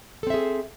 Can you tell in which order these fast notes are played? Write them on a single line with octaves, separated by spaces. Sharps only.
A4 C4 E5 G#4